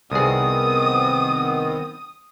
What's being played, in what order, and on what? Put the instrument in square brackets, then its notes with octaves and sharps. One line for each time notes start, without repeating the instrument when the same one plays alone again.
[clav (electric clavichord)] C2 G#4 [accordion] D#3 B3 C4 [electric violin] D#6